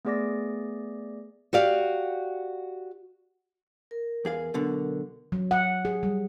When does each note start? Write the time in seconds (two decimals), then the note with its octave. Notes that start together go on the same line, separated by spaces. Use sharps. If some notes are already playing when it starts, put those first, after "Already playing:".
0.05 A3 B3 G#4 D5 D6 A#6
1.53 F#4 G4 D5 F5
3.91 A#4
4.25 E2 G#4 F5
4.54 B1 B2 D3
5.32 F#3
5.51 F#5
5.85 G#4
6.03 G3